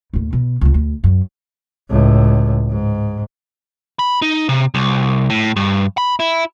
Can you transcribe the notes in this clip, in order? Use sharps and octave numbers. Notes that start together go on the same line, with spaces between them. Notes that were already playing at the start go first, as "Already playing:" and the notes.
D#2 A2
B2
C#2 C#3
D2
F#2
C#2 A2
G#2
B5
D#4
C3
C2
A2
G2
B5
E4